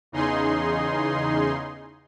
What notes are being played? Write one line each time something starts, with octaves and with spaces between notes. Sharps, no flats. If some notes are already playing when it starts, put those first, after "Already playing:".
E2 C#3 D#4 G#4 C6